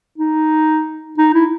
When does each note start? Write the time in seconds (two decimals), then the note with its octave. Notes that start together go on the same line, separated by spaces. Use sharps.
0.18 D#4
1.18 D#4
1.34 E4